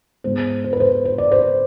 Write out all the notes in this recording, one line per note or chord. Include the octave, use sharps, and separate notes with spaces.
G#2 G#3 B3 C5
C5
B4
C5
C5
D5
C5